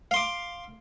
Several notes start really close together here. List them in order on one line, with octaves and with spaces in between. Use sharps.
F5 C6 D6